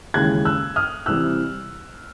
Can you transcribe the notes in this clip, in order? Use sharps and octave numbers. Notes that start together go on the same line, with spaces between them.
D#2 C#3 E3 G#3 F#6 G#6
E6 F#6
D#6 F6
C3 E3 G3 E6 F#6